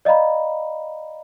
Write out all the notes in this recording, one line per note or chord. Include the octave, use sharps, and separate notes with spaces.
D5 D#5 F5 A#5 B5